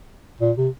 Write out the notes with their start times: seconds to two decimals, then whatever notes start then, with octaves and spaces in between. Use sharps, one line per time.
0.41 A#2
0.57 C3